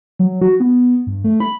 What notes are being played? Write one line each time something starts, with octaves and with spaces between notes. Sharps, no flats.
F#3
F#4
B3
G2
A3
B5